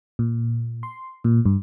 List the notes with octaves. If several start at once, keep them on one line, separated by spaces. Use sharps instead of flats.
A#2
C6
A#2
G2